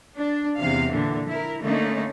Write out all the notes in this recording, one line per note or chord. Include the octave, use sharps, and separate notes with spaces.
D4
E2 C3 F5
A#2 D3 E3
E4 A#4
D3 A3 A#3 C#4 D#4